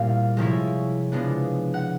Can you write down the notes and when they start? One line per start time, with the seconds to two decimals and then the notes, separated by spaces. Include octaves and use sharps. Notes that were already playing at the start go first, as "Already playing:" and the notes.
Already playing: A#2 G3 C4 E4 F5
0.37 C3 F3 G#3 C#4 E4
1.12 C#3 F3 G#3 B3 D4
1.74 F#5